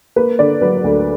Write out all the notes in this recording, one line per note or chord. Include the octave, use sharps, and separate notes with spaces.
A#3 B4
D3 D5
F#3 B4
D2